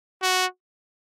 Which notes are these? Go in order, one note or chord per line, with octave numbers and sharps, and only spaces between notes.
F#4